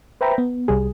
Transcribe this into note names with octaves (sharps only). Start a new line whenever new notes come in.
B4 C5 E5 G5 A#5 B5
B3
C2 G3 G#4